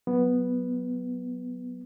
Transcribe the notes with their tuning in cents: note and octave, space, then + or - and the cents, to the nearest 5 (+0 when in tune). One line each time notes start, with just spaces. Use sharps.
F#3 +0 B3 +0